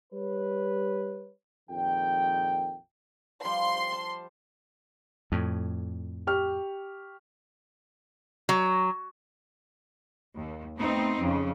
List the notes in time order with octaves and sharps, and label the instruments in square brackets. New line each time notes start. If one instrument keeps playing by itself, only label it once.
[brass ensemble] G3 B4 C#5
A#1 F2 D#3 G5
[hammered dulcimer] F3 G3 G4 [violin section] C6
[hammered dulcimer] A5
[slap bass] F2 A2
[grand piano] G4 C#6 F6
[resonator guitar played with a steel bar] F#3
[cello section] D#2
A3 B3 C4 D#4
F2 C#3